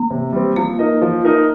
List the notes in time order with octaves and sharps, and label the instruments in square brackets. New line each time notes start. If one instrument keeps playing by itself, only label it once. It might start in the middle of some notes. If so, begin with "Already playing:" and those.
Already playing: [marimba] A#3
[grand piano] C3
G3 C4
[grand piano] F3 [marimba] A#3
[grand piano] D#4 A#4 D#5
F3
D#4 A#4 D#5